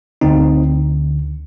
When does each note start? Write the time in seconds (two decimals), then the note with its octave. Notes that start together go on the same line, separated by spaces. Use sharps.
0.21 D2 D3 C4 D#4